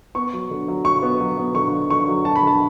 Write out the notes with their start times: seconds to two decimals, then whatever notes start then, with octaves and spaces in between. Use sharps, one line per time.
0.15 B3 C#6
0.33 F#3
0.51 D3
0.68 F#3
0.85 F#3 C#6
1.02 B3
1.20 F#3
1.38 B3
1.55 D3 C#6
1.73 F#3
1.90 D3 C#6
2.08 F#3
2.25 F#3 A5
2.36 B5
2.43 D3 A5